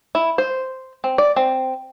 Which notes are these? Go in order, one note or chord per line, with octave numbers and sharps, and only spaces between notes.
E4
C5
C4
D5
C4